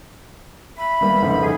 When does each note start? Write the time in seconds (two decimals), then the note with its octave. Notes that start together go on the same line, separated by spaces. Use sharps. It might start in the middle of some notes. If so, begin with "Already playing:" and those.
0.77 E5 B5
1.01 G3 A#3 B3
1.22 F1 G#2 C#3
1.41 D3 G#4